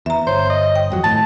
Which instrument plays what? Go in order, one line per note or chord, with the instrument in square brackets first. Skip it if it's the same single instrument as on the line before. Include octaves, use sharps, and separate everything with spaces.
[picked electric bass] E2 [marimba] E5 A#5
[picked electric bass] G1 [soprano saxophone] C5 [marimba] C#5
[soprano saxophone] D#5
[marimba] G5
[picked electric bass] G#1 F2 F#3
[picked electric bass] G#1 A2 [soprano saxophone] A5 [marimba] A6